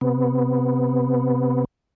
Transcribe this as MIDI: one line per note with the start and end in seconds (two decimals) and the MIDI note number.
0.01 1.65 48
0.01 1.65 59